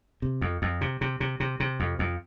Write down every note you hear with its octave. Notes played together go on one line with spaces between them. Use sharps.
C3
F2
F2
C3
C3
C3
C3
C3
F2
F2